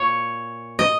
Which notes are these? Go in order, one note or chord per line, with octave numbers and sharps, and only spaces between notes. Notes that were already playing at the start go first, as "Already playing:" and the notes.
Already playing: A#2 C#5
D#5